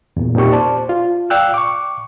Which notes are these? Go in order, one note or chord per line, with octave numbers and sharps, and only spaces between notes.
E2 A#2
A#2 C4 D#4 G4 C#6
C5 D5 A5
F4
D5 F5 G5 E6 F#6
C#6 D6